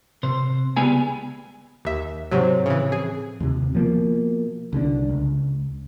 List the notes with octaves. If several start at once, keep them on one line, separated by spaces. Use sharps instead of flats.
C3 C5
C#2 G3 B3 G#4 B4 G#5
D#2 E5
G#2 C3 F#3 C4 C5 C#5
A2 C#3 E3 F3
G#4
D#2 C3
B2 F3 A#3
C2 D3 F#3 D4
C#2